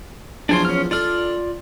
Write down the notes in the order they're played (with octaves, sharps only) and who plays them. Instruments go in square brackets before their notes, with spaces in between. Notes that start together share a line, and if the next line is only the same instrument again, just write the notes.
[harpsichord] E2 F3 F#3 [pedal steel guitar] D4 G#5 C6
[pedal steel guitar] C#4 F6
[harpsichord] D4 A4 [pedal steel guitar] F4 D5 F6